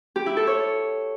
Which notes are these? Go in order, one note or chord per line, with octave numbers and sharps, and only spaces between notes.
G4
E4
A4
C#5